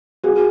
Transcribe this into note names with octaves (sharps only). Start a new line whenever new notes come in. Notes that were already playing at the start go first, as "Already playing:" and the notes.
F#4 G#4